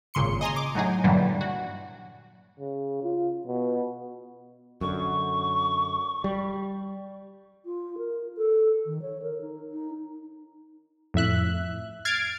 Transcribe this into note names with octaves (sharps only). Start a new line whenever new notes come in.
G#1 A#2 C#3 C6 C#7
D#5 G#5 A#5 C6
D6
A2 F#3 D#4 G#4
G2 A#2 D3 E3 F#3 G3
F#4
C#3
F4
B2
F#2 D3 C#6
G3
F4
A#4
A4
D#3
C#5
A#4
D#4
D#4
F2 A2 E5 F#6
F6 G#6 A6 C7 D7